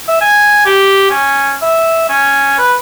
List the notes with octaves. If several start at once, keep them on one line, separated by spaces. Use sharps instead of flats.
E5
G#5
G4
C#4
E5
C#4
B4